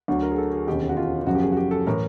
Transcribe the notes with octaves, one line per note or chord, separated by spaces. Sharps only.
D2 D3 F#3
A#4
G#4
A4
G#4
E1 D#2 C#3 G4
F#4
F4
F#1 F#2 C#3 F3 F#4
G4
G#4
F#4
G4
A4
A2 E3 A#4